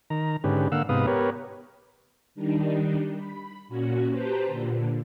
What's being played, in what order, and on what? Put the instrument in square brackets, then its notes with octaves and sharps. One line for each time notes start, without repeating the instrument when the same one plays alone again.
[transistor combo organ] D#3 A#5
G#2 D3 C#4 G4 B4
D3 A#3 F5 F#5 E6
G#2 C3 B3 B4 F5 D#6
B3 G4 A#4 B4 C#5
[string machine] D#3 G3 D4 D#4
B5
A#2 C#4 F#4
G4 B4 C5 A5 A#5
A#2 D3